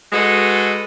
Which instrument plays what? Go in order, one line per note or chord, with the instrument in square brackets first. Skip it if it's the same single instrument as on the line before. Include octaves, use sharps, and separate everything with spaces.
[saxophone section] G#3 F#4 A4 B4 D#5